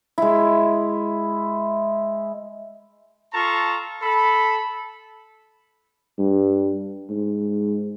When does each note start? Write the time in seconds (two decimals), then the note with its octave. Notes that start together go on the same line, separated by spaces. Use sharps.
0.18 G#3 E4
3.33 F4 A4 A5 A#5 C#6
4.01 A4 B5
6.19 G2
7.10 G#2